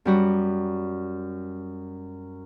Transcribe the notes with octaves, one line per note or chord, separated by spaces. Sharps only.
F#2 G3 F#4